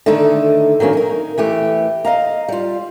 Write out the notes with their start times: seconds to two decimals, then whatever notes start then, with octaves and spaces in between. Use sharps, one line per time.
0.06 D3 D#3 A3 D#4 A4
0.80 D#3 F#3 A#3 C#4
0.93 D#4 A#4
1.38 E3 A3 G4
2.05 D#5 F5 A#5
2.48 G3 F4